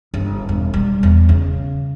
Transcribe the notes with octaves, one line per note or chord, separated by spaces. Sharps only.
G1
E1
G3
E2
C#3